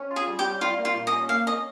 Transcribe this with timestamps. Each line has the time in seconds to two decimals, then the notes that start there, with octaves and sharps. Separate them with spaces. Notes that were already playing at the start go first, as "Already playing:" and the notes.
Already playing: C#4
0.11 F4
0.16 G#4
0.27 G3
0.39 G4
0.45 G3
0.61 G3 F4
0.78 A#3
0.85 F4
0.95 A#2
1.07 D#5
1.12 C#4
1.29 A#3 F5
1.47 C#4 D#5